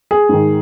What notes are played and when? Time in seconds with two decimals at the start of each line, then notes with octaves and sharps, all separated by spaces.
0.11 G#4
0.29 G#2 D#3